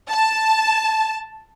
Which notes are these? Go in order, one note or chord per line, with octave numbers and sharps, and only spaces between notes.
A5